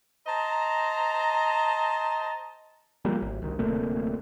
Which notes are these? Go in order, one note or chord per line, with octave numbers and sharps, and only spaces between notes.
C5 D#5 A5 A#5
F3 G3 A#3
G#1
C2 D#3
D1 C3 A3 A#3